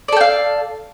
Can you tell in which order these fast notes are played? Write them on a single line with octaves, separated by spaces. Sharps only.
D5 A4 G5 F5